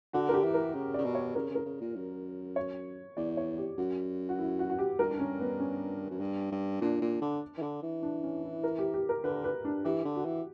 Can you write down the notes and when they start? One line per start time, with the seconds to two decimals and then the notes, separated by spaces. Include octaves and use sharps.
0.13 D3 F#4
0.29 A#4
0.34 G4
0.44 E3
0.54 A#4
0.74 C#3
0.94 C#3 D5
1.05 B2
1.15 C#5
1.35 C#3 A#4
1.50 C#3 A#4
1.66 C#3
1.81 A#2
1.96 F#2
2.56 C#5
3.17 E2 D5
3.37 C#5
3.58 G4
3.78 F#2 F#4
4.29 F#4
4.39 E4
4.59 F#4
4.70 F#4
4.79 G4
4.99 G2 A#4
5.10 D4
5.19 C#4
5.40 B3
5.60 C#4
6.10 F#2
6.20 G2
6.51 G2
6.81 A#2 D4
7.01 A#2
7.22 D3
7.58 E3
7.62 D3
7.82 E3
8.02 D4
8.23 C#4
8.43 E4
8.64 A#4
8.79 G4
8.94 G4
9.09 A#4
9.24 D3 B4
9.44 B4
9.65 D4
9.85 E3 G4
10.05 D3
10.15 F#4
10.25 E3